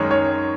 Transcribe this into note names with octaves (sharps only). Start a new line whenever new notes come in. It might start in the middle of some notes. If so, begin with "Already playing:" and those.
Already playing: F#2 D#3 G#3 C#5
C#5